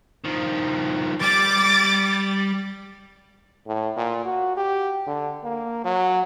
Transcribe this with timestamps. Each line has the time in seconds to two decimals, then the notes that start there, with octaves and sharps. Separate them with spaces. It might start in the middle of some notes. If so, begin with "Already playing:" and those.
0.24 D#3 F3
1.21 G3 D6 A6
3.67 A2
3.97 A#2
4.25 F#4
4.57 G4
5.07 D3
5.44 A#3
5.85 F#3